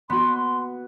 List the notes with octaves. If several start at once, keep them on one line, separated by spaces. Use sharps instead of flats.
B3 F#4 C6